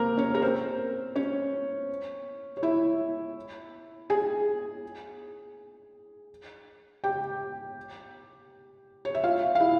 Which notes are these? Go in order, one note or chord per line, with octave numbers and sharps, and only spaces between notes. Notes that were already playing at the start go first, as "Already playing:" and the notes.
Already playing: A#3 C4 A#4
C#4 C#5
A#4
C4 C5
C#4 C#5
C#5
E4 E5
G#4 G#5
G4 G5
C#5
E5
F4 F5
F5
E4 E5